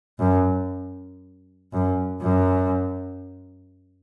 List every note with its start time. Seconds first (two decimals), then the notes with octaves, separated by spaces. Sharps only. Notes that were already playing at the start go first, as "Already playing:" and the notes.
0.19 F#2
1.73 F#2
2.22 F#2